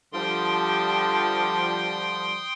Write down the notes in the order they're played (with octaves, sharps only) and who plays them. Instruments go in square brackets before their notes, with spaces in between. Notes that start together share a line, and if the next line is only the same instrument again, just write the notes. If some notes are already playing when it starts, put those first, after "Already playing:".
[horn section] D3 F3 G3 [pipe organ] G5 C6 D#6